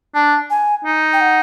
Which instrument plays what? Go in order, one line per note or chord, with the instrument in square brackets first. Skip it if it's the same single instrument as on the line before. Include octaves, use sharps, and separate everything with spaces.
[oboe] D4 [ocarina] A5
[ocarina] G#5
[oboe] D#4
[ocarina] G5
F#5